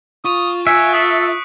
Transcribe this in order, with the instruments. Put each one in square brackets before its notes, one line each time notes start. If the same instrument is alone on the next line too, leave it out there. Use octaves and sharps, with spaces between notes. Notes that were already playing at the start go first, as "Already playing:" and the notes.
[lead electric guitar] F4 [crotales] C#6 D#7 [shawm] D#6
[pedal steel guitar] E5 [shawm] G#5 [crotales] F#6 C#7 D7
[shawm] A4 [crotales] D#6 B6